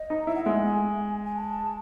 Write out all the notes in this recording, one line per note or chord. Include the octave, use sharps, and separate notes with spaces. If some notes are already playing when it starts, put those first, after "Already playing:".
Already playing: D#5
D#4
E4 E5
F#5
G#3 E5
F#5
G#5
G#5
A5